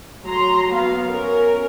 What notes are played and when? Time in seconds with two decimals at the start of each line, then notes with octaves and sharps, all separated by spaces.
0.25 F#3 A#5 C6
0.72 F#3 B3 F5
1.08 C#4 A#4